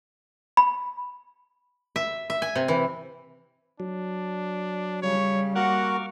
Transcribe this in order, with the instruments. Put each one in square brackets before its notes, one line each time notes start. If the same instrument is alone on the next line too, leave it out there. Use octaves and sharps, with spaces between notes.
[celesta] B5
[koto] E5
E5
G#5
C3
E3
[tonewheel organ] F#3 [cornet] D4
[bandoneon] C#3 [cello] G3 [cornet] C#5
[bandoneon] A#3 F#4 A#4 [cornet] F#5 [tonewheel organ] C#6 D6 F6